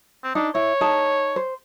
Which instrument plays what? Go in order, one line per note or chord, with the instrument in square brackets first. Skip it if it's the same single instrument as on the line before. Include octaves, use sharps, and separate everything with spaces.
[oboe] C4
[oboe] D4 [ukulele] D#4
[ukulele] E4 [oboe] C#5
[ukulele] D#4 G#4 A5
C5